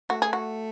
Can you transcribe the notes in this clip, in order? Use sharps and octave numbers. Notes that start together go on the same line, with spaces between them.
A3 F#4
G#4
F#4